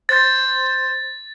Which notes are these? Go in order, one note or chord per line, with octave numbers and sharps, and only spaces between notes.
C5 A6